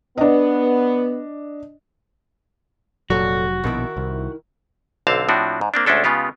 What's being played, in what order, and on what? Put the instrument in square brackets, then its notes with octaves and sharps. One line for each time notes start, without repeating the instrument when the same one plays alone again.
[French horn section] B3 [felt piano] D4 D#5
[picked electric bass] F1 F#3 [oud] A#2 A4 C#5 [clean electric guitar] F#4
[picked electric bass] A#1 B2 [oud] D#3 E4
[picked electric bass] C2
[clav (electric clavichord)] B1 D3 C4 F5 A5
A2 F3 C4 D4 F#4
G#2
A#3 C4 D4
D2 G#3 C#4 D4 A4
C#3 G#3 B3 F4 G4